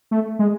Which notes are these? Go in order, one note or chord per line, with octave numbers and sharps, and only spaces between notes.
A3
G#3